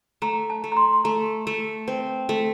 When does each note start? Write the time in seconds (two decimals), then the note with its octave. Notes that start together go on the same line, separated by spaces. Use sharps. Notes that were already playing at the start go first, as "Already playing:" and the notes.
0.22 A3 A#5
0.50 A5
0.64 A3
0.72 A#5
0.77 C6
0.93 C6
1.04 A3 A#5
1.47 A3
1.88 C4
2.29 A3